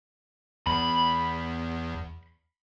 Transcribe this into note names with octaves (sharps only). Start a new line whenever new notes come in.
E2 B5